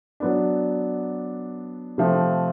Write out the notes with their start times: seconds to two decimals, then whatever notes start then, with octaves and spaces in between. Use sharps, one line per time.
0.20 F#3 B3 D4
1.98 C3 F3 A3